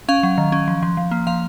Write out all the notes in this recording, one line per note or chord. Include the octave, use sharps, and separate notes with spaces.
C#4 F5
F#3
D#3
C#4
F3
F3
F3
A#3
F3 F5